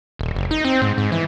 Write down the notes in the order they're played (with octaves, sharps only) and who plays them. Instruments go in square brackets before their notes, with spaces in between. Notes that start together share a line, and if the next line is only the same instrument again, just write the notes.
[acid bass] D#1
F#1
D#4
C4
G#2
G#2
E3